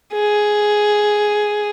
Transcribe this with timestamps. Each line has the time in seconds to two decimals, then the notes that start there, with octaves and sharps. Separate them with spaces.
0.13 G#4